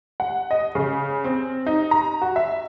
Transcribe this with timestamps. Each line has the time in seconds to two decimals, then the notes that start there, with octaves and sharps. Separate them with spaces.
0.20 F#5
0.51 D#5
0.75 C#3
1.25 C4
1.66 D#4
1.91 A#5
2.21 F#4
2.36 E5